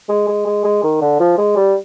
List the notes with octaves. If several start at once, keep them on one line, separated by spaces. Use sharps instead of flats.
G#3
G#3
G#3
G#3
D#3
D3
F3
G#3
G3